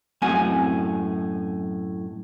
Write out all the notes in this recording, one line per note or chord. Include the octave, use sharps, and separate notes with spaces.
F#2 A2 C4 F#5 G#5